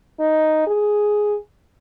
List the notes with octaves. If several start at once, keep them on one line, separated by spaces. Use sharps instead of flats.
D#4
G#4